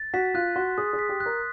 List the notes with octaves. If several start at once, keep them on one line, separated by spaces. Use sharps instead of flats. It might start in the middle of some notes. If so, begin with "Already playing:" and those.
Already playing: A6
F#4 B6
F4 F#6
F#4 C6
G#4 D#6
G#4
B6
G4
F#6
A#4